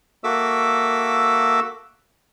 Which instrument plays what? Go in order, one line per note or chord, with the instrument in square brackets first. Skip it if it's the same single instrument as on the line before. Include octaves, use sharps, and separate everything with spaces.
[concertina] A#3 F#4 A4 E5 D6 E6